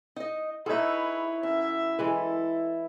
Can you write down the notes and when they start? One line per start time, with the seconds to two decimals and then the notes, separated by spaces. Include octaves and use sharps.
0.16 D#4 D#5
0.66 D#4 E4 G#4 A4 B4 C#5 E5
1.43 F#2 E5
1.99 E3 G#3 A4 B4